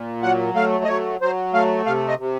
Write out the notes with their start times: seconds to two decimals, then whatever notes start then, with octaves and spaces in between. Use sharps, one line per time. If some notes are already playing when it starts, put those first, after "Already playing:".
Already playing: A#2
0.23 F#3 F#5
0.55 A3 F5
0.84 D#5
0.88 F#3 C#5
1.21 F#3 C5
1.54 A3 F5
1.86 C3 F5
2.08 D#5
2.19 C3